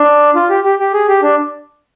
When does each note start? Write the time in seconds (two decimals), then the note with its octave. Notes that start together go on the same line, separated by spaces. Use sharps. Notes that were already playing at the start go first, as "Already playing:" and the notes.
Already playing: D4
0.35 F4
0.50 G4
0.64 G4
0.79 G4
0.94 G#4
1.08 G4
1.22 D4